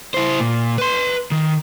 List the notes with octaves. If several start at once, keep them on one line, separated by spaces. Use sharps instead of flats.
E4 C5
A#2
B4 C6
D#3